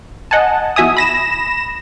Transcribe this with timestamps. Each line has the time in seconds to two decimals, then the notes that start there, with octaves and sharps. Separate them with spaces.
0.31 D#5 F#5 G#5 A5
0.76 E2 F#4 E5 G#5 D#6
0.97 B5 A#6 E7